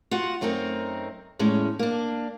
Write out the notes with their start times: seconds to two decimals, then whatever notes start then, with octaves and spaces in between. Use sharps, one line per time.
0.11 F4 F#4 F#5
0.41 F#2 A3 C4 D#4 A#4
1.39 E2 A2 G#3 C#4
1.79 A#3 D4